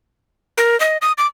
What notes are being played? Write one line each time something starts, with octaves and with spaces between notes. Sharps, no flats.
A#4
D#5
D#6
D6